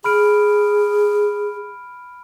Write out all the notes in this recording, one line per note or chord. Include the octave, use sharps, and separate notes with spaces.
G#4 B5 F6 D7